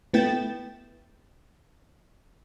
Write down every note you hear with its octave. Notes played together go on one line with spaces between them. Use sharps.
A3 B3 E4 G5 A6 E7